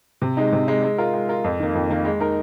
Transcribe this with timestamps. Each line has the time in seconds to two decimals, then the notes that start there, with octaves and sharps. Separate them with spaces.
0.22 C3
0.37 G#3 D#4
0.53 C3
0.68 G#3 D#4
0.83 G#3
0.98 F4 A#4
1.14 G#3
1.29 F4 A#4
1.44 F2
1.59 D#3 A#3
1.75 F2
1.90 D#3 A#3
2.05 G#3
2.20 D#4 A#4